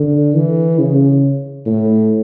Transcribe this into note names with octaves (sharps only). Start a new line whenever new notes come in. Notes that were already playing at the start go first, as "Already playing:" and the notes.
Already playing: D3
E3
C#3
A2